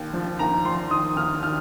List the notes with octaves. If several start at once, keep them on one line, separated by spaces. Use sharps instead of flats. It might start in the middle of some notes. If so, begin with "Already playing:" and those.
Already playing: D#2
F3
D#2 A#5
F3 C6
D#3 D#6
D#2 F6
D#3 F6